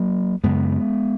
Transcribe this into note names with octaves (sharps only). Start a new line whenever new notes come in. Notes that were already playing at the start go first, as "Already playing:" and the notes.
Already playing: F#3 A#3
F#2 C#3 G#3 B3